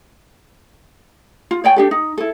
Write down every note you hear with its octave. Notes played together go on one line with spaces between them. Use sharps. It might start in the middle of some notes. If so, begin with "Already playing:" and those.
F4
C#5 D5 G5 G#5
D4 G4 A4
D#4
E4 A4